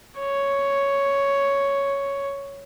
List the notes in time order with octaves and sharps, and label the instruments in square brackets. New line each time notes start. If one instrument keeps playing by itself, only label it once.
[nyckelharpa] C#5